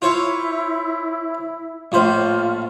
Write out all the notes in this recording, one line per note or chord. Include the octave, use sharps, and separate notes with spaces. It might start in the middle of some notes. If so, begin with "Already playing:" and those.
E4 F4 C5 C#5
A#1 A2 F4 C5